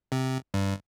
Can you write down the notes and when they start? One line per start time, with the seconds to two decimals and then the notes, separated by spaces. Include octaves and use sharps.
0.12 C3
0.54 G2